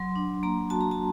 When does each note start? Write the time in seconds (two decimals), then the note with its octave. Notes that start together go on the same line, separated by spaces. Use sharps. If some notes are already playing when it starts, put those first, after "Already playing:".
Already playing: F#3 C6
0.16 D4
0.43 A#3 A#5
0.70 F#4 A5
0.81 A#5
0.91 A5